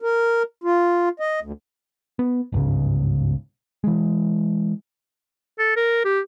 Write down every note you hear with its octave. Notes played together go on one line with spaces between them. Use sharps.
A#4
F4
D#5
D2
B3
G1 C#2 G#2 C#3
E3 G#3
A4
A#4
G4